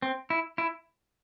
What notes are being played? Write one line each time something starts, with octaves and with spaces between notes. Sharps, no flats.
C4
E4
E4